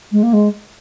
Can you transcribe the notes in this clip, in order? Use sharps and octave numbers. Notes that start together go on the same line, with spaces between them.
G#3
A#3
G#3